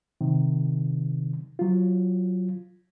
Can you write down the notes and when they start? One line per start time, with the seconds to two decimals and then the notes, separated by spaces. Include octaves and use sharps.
0.21 C3 D#3
1.59 F#3 F4